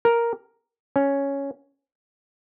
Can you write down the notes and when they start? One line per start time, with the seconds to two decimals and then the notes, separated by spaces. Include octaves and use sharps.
0.05 A#4
0.96 C#4